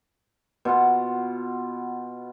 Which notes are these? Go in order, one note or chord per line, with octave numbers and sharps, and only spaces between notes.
B2 F4 F#5